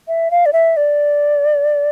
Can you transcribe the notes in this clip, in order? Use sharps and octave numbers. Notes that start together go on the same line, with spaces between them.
E5
F5
D5
E5
D5